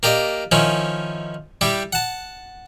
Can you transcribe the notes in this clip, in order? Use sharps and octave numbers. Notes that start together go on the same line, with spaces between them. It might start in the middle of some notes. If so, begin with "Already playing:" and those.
A#3 G4 D5 D#5
D#3 F3 C#4 E4
G3 E4 G4
F#5 A5